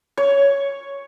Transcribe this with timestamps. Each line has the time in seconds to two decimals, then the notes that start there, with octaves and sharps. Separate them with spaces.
0.17 C#5